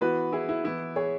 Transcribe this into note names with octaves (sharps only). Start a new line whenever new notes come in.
E3 B3 F#4 B4
E4 G#4
E4
E3 B3 E4
G#4 C#5